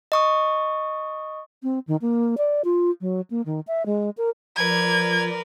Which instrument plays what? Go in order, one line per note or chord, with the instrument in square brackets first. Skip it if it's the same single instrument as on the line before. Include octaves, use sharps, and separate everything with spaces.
[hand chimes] D#5 C#6 D#6
[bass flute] C4
D#3
A#3
D5
F4
F#3
A#3
D#3
E5
G#3
A#4
[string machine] F3 D5 [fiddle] A#4 B4 [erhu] G#6